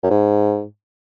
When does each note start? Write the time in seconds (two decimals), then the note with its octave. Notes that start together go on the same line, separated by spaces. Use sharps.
0.03 F#2
0.10 G#2